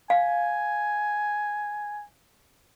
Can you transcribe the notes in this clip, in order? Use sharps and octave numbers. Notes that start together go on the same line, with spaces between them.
F5 G#5